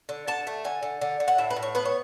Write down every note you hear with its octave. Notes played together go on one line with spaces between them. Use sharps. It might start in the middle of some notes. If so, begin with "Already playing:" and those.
D3
D3 A5
A3
D3 G#5
D3
D3
D3
F#5
A2 E5
B4
A2
C#5
B3 B4
C#5